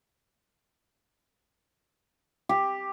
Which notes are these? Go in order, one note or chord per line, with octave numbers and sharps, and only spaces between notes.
G4